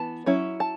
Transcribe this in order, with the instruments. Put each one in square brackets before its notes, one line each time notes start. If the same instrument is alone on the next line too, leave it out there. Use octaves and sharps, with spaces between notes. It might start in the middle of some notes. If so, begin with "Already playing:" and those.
Already playing: [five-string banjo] E3 B3 A5
F#3 C#4 E4
A5